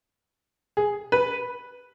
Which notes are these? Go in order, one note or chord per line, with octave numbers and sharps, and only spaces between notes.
G#4
B4